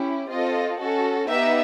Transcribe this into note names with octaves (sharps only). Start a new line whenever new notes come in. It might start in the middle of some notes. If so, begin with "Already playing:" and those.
Already playing: C#4 E4 G4
C4 F4 A4 D#5
C#4 F#4 A4
B3 D#4 G4 E5